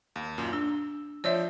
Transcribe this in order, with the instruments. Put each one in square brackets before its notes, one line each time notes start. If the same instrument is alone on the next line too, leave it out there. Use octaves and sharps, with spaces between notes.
[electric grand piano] D#2
F#2 A#2
[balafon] D4 [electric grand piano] E6
[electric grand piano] F3 E6 G6 [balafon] C#5 D5 E5